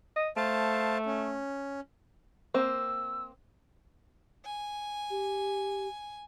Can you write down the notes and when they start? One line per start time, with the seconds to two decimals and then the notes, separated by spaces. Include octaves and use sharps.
0.16 D#5
0.37 A3 C5 F5 A5
1.06 C#4
2.54 A#3 C4 E6
4.45 G#5
5.10 G4